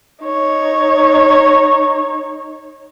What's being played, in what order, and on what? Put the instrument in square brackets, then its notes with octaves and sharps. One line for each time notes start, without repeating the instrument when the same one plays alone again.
[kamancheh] D#4 C#5